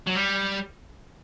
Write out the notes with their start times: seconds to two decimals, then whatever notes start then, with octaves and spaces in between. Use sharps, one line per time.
0.07 F#3
0.15 G3